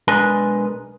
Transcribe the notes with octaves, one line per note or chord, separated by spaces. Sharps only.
B1 G#3 D4 A#4 B4 G#5